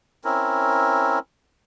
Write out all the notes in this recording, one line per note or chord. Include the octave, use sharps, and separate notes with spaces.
C4 C#4 E4 A#4